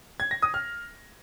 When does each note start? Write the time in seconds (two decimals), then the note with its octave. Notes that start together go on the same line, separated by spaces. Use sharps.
0.20 G#6
0.31 A#6
0.42 D#6
0.54 F6